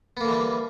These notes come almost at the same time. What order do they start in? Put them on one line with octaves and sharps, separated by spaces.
B3 A#3 D3 E3 G3